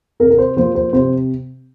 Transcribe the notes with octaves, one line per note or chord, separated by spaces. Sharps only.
C3 A#4
A#4
C5
F3 A#3 C5
C5
C3 C5